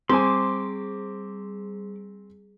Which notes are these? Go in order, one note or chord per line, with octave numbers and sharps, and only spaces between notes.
G3 C4 G#4 G#5 C6 D6